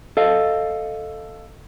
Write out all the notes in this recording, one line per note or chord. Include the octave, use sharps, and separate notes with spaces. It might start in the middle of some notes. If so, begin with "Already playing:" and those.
A4 D#5 F5